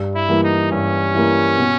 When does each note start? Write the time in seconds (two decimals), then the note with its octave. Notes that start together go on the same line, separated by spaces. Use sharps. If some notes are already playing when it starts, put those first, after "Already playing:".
Already playing: G2
0.15 E4
0.29 E3 G3 A#3
0.44 D#4
0.72 G2 C#4
1.14 E3 G3 A#3
1.57 B2